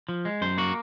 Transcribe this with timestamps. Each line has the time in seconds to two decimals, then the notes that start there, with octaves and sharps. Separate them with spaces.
0.09 F3
0.25 G#3
0.42 F#2 C5
0.58 A#3 F#4